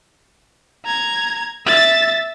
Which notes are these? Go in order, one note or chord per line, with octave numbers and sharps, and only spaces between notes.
A#5 G#6
E5 A6